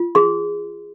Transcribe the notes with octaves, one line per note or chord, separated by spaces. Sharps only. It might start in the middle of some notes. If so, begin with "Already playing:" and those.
Already playing: F4
G#4 C6